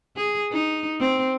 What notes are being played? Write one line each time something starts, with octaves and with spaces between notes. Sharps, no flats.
G#4
D#4
C4